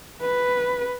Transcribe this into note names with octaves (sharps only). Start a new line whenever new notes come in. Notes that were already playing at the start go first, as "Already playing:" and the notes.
B4